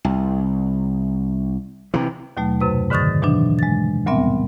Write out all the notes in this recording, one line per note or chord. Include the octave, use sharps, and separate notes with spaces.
C2
C3 E3
D#2 B2 F#3 A3
F#2 C3 B4
G#2 D3 D#3 C#6 D#6 A6
B2 E3 F#3 D4
G#3 A6
D2 A#2 G3 B3 C4 E5